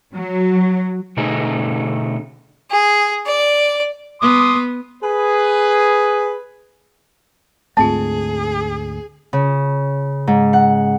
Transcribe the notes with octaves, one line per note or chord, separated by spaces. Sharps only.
F#3
B2 D3 A3 D#4 G#4 G#5
G#4
D5
B3 C6 D6 D#6
G#4 B4
D2 G#2 A3 C4 F4 G#4 A5
C#3
G#2
F#5